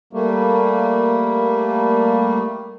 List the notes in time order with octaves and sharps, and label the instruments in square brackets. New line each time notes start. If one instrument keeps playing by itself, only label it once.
[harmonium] G3 A3 A#3